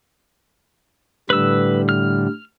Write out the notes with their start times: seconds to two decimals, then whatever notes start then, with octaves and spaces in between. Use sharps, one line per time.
1.30 A2 D3 G3 B4 E6
1.89 F6